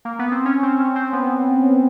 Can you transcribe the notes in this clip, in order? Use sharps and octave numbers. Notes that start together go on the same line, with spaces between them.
A#3
B3
C4
C#4
C4
C#4
C4
B3